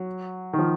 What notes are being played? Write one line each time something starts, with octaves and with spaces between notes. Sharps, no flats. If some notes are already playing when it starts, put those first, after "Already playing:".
Already playing: F#3
D#3
F3